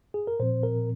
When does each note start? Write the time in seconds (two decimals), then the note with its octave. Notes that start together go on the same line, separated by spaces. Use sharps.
0.14 G#4
0.27 A#4
0.40 A#2 F3 C4 C5
0.63 A#4